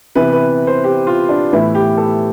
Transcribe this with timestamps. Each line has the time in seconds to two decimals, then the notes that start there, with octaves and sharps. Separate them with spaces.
0.15 C3 E3 B3 B4
0.33 B4
0.67 C5
0.84 G4
1.07 F4
1.29 D4
1.52 A2 E3 B3 E4
1.75 G4
1.97 A4